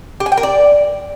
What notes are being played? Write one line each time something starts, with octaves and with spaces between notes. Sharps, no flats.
G4
G#5
G5
A#4
D5